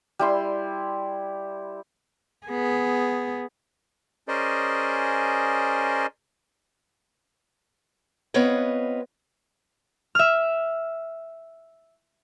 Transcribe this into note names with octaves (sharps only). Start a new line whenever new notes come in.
G3 E4 C6
B3 G#4
C#4 G#4 A#4 C5 D5 D#5
B3 C4 F4 B4 C#5 D#5
E5 F6